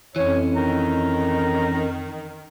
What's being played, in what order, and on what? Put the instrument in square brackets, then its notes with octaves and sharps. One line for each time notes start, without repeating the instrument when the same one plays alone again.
[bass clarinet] F2 [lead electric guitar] E3 C#4 [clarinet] C#5
[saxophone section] D#3 [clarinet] A#5